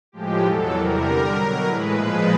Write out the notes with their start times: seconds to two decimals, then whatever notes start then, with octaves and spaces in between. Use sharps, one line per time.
0.12 A2 F3 G#3 G4
0.42 E2 B2 F#3 A4
0.72 E2 C3 E3 G3 A#4
1.02 F#2 D3 G3
1.33 B2 F#3
1.63 A2 E3 G#3 B4
1.93 A#2 F3 G#3 B4